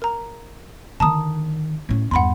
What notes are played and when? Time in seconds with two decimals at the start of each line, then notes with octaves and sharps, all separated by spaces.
0.02 A#4 A#5
1.00 D3 D#3 A5 A#5 D#6
1.89 A2 C#4
2.11 E2 G2 F#5 B5 C6